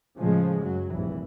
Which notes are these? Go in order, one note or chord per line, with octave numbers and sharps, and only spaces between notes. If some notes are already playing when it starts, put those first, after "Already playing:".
A2 C#3 F3 G#3
F#2 F#3
F1 A#1 G2 E3